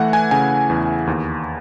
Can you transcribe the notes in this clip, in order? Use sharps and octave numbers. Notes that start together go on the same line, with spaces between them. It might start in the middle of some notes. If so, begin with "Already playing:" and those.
Already playing: E3 A3 F#5
G#5
C#3 G#5
E2
D#2